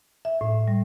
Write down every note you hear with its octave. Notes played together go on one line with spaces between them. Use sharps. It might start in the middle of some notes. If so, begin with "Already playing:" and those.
E5
A2
G3